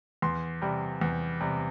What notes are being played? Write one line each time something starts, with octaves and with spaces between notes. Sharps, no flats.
E2 C6
C3 G3
E2
C3 G3